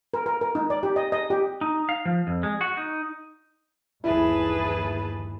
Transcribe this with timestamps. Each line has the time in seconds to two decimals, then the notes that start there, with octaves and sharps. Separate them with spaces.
0.14 A#4
0.26 A#4
0.41 A#4
0.55 D#4
0.70 D5
0.83 G4
0.96 D#5
1.12 D#5
1.30 G4
1.61 D#4
1.89 F5
2.05 F3
2.27 F2
2.43 G#3
2.61 F#4
2.77 D#4
4.04 G1 D#2 E3 E4 G#4 B4 A5